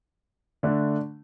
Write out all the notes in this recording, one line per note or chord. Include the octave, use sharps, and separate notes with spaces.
D3 A3 D4